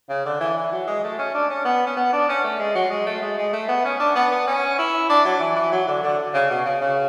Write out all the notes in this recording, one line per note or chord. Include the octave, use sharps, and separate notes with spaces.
C#3
D3
E3
E3
F#3
G#3
A3
C#4
D4
C#4
B3
C#4
B3
D4
C#4
A3
G#3
F#3
G#3
A3
G#3
G#3
A3
B3
C#4
D4
B3
B3
C#4
E4
D4
F#3
E3
E3
F#3
D3
D3
C#3
B2
C#3
C#3